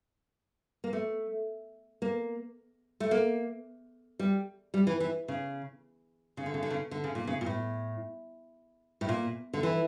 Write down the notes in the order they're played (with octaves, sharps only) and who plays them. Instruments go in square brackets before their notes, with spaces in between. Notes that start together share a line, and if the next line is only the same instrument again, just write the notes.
[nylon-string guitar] A#3
A3
A#3
A3
A#3
G3
G3
E3
E3
C#3
C#3
D3
C#3
D3
C#3
D3
C#3
A#2
C#3
A#2
A2
A2
A#2
D3
E3